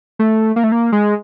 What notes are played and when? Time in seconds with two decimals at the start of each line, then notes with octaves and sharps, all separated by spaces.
0.19 A3
0.56 A#3
0.64 A3
0.72 A#3
0.92 G#3